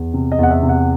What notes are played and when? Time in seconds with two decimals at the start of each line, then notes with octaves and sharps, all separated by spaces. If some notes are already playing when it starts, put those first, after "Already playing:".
Already playing: E2
0.14 C3
0.32 D#5
0.38 E2 F#5
0.50 E5
0.62 C3
0.69 F#5